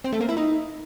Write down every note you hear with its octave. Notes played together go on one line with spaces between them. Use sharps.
C4
A3
A#3
E4
D#4